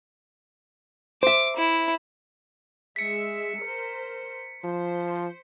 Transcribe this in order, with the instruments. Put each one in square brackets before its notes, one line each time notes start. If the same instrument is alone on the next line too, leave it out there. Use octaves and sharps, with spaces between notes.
[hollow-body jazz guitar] C5 E5 [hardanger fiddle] D6
[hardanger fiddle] E4
[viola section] G#3 E5 [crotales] B6 C#7
[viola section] A#4 C5
[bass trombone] F3 [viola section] C5